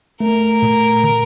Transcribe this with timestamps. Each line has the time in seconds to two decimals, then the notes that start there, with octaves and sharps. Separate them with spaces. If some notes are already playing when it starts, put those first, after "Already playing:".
0.20 A3 A#4
0.62 A#2
1.04 D3